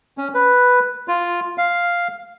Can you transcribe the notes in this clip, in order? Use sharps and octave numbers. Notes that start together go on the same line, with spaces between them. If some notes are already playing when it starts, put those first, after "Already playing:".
C#4
B4
F4
F5